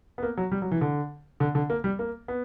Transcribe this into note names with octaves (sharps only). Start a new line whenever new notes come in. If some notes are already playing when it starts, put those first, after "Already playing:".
B3
A#3
F#3
G3
F#3
E3
D3
D3
D3
A#3
G3
A#3
B3